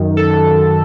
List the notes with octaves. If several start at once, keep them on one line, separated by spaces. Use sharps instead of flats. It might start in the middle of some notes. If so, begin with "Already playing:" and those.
Already playing: F#2 D#3
A4